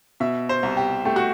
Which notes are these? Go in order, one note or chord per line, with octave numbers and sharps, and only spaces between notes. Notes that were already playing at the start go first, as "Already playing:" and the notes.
B2 E5
C5
C2
G4
A3 G4
F#4